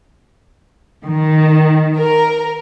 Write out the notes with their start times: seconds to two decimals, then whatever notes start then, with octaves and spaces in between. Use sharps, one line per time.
1.05 D#3
1.98 A#4